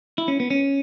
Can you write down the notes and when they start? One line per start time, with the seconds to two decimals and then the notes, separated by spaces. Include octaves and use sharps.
0.18 E4
0.28 C#4
0.40 B3
0.50 C#4